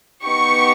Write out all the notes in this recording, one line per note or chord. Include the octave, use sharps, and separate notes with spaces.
B3 D#4 G4 C#6